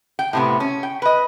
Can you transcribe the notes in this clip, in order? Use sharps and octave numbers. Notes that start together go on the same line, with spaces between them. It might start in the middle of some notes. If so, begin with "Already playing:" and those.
G5
A2 C3 B3
C#4
G5
B4 D#5